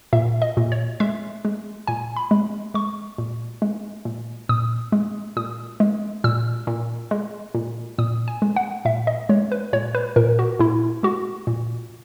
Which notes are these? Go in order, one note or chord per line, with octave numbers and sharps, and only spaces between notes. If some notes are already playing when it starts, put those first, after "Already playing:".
A#2 E5
D#5
A#2
C#5
G#3 E5
G#3
A#2 G#5
B5
G#3
G#3 C#6
A#2
G#3
A#2
A#2 D#6
G#3
A#2 D#6
G#3
A#2 E6
A#2
G#3
A#2
A#2 D#6
G#5
G#3
F#5
A#2 E5
D#5
G#3 C#5
B4
A#2 C#5
B4
A#2 A#4
F#4
A#2 E4
G#3 F#4
A#2